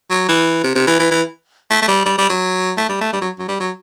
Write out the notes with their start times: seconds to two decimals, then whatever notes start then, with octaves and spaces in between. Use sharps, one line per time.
0.10 F#3
0.28 E3
0.64 C3
0.75 C3
0.87 E3
1.00 E3
1.11 E3
1.70 A3
1.82 A3
1.88 G3
2.06 G3
2.18 G3
2.30 F#3
2.77 A3
2.89 G3
3.01 A3
3.13 G3
3.22 F#3
3.39 F#3
3.48 G3
3.60 F#3